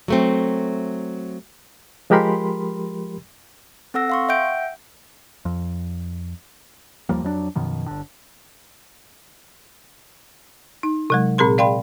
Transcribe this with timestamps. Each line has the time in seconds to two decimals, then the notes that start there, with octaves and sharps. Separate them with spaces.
0.08 F#3 A3 C4
2.10 F3 G#3 G4 A#4 B5 C6
3.94 C4 A4 F#5 E6 A#6
4.10 F5 C6 C#6
4.29 E5 F#5 G5 G6 D7
5.45 F2
7.09 D#2 F3 G3 A#3
7.23 F2 F#3 B3 D4
7.55 F#2 B2 D#3 F3
7.86 G1 D3
10.83 D#4
11.10 C3 F#3 G#3
11.38 A#2 C4 G#4 A#4 C6
11.58 D5 F5 G5 B5 C6